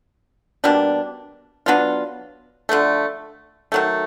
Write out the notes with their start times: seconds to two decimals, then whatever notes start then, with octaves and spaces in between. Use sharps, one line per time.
0.64 B2 G3 A#3 D4
1.66 F#3 B3 D4 F4
2.69 D3 F3 A3
3.72 D#3 F#3 A3